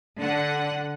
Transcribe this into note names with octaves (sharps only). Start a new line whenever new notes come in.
D3 F#5